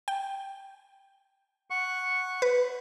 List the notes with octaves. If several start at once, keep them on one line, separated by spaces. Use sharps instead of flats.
G5
F#5 C#6
B4